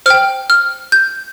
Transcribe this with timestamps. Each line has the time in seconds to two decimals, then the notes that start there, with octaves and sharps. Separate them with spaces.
0.06 C5 G5 F6
0.50 F6
0.92 G6